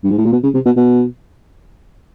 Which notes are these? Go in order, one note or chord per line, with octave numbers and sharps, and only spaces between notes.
G2
G#2
A2
A#2
B2
C#3
C3
B2
B2